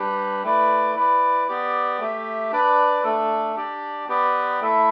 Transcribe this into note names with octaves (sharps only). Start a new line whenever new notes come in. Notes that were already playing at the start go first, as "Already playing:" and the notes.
Already playing: G3 D4 G4 B4
A3 E4 B4 D5
E4 B4 D5
B3 G4 D5
A3 G4 E5
D4 B4 D5
A3 D4 A4
D4 G4 D5
B3 G4 B4 D5
A3 E4 A4 E5